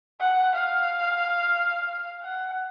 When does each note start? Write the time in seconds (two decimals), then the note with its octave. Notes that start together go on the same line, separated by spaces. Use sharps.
0.20 F#5
0.54 F5
2.23 F#5